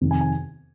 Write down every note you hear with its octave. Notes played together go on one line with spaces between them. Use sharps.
F2 C3 D#3
G#5
G#5